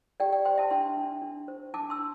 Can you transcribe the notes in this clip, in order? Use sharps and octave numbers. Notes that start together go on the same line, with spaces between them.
G4 D5 G5
D5 G5
C5 G5 C6
E5 A5
D4 G5 C6
D4
D4
C5
D4 A5 D6
C6 E6
D4